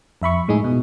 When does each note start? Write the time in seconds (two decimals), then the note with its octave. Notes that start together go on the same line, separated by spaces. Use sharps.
0.22 F2 E5 B5 C#6
0.48 A2 G#3 D#4 G#4
0.64 B2